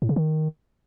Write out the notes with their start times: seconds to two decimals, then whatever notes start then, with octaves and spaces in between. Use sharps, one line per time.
0.02 A2
0.09 C#3
0.16 D#3